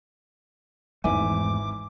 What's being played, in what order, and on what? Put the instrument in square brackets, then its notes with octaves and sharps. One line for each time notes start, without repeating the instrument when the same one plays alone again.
[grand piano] G#1 E3 E5 [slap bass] E2 G#2 A3 [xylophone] G#5 [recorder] D6